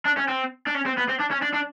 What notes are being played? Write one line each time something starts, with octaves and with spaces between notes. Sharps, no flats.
D4
C#4
C4
D4
C#4
C4
B3
C4
D4
C#4
D4
D4